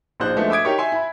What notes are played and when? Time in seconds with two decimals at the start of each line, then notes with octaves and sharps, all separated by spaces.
0.20 A#1 F3 D#4 C5 F#6
0.36 F3 G#3 A3 B3 D4 E4
0.50 E5 D6 D#6 G#6 D7
0.65 D#4 G4 A#4 C#5
0.78 E5 G#5 C6
0.92 E4 B5